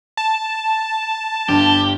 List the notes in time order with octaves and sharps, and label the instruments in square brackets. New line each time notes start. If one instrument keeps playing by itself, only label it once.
[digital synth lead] A5
[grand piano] G1 G2 [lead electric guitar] G4